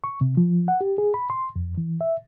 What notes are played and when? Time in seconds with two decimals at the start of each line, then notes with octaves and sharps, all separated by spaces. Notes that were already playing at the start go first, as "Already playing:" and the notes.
0.04 C#6
0.21 C3
0.37 F3
0.68 F#5
0.81 G4
0.98 G#4
1.14 B5
1.30 C6
1.56 F2
1.78 E3
2.01 E5